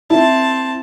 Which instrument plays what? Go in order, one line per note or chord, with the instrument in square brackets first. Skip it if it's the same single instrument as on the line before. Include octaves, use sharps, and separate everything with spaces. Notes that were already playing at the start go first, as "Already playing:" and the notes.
[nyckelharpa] C4 A5 [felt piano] E4